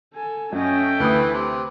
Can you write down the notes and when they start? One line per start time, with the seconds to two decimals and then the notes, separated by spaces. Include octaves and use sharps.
0.14 A4 G#5
0.52 F#2 A3 C#4 D#5 G5
1.00 D2 E3 B4 D#6
1.34 C3